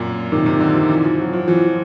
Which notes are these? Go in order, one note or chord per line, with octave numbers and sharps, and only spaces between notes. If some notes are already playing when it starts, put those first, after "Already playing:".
Already playing: F#2 A#2
C3 D#3
C3
D3
F3
E3
F3
F#3
F3
E3 F3